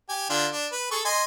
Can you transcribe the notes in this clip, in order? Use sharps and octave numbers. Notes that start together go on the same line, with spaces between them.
G4 G#5
D3 D4 F4
D4
B4
G#4 A4 C#6
D#5 G#5 C6